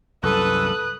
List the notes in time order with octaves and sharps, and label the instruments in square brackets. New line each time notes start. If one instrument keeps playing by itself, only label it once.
[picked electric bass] C2 F#2 [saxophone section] A4 [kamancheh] B4 D#6 [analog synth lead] F#6